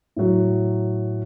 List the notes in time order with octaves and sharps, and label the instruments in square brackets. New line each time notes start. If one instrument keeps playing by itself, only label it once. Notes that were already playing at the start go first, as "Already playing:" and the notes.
[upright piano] A2 F#3